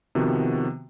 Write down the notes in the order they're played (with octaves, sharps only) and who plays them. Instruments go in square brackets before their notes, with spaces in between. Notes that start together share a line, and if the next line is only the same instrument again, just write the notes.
[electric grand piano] C3 D#3 F3 B3 F#4